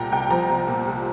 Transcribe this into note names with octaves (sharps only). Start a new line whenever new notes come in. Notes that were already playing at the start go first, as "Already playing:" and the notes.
Already playing: C2 A#2 G5 A#5
C2 G5
F3 A#5
C2
A#2
C2